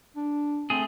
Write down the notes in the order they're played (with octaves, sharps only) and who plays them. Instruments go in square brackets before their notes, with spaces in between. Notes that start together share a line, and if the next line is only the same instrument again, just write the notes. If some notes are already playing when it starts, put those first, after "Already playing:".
[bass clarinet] D4
[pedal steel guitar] A3 G#4 [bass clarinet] C4